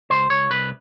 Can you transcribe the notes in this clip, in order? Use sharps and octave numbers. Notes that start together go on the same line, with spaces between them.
C#2 C5
C#2 C#5
C2 B4